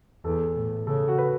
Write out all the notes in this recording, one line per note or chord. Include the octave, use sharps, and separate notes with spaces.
E2 A4
A2
C#3 A4
F#4
B4